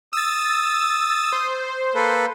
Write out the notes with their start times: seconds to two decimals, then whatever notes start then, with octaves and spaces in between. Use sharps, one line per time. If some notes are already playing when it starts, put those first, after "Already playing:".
0.13 D#6 E6 A6
1.32 C5
1.95 A#3 A4 B4